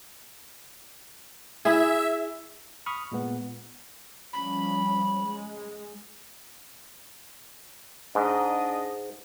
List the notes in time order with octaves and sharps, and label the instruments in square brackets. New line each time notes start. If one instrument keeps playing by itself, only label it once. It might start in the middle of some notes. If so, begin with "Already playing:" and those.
[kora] E4 G#4 [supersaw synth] E5
[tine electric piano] B5 C#6 D#6 F6
A#2 G#3 B3
[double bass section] F3 G3 C#4 [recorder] B5
[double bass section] G#3
[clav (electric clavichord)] G#2 [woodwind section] D4 D#5